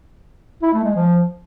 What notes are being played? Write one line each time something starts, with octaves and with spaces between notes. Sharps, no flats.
E4
A3
G#3
F3